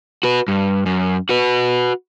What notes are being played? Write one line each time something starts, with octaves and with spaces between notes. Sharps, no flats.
F#4 B4
G2
F#2
F#4 B4